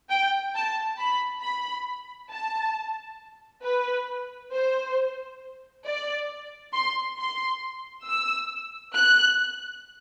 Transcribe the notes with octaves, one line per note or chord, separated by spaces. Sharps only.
G5
A5
B5
B5
A5
B4
C5
D5
C6
C6
E6
F#6